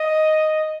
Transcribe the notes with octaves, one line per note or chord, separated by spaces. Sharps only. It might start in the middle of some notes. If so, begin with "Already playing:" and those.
Already playing: D#5